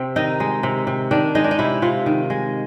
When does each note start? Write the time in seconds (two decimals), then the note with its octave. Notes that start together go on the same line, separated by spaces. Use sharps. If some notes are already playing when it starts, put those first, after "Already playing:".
Already playing: C3 C4
0.16 D#3 D#4
0.40 G#3
0.63 C3
0.87 C3
1.11 D#3 D4
1.35 G#3 D#4
1.44 D4
1.51 D#4
1.59 C3 E4
1.82 C3 F4
2.06 D#3
2.30 G#3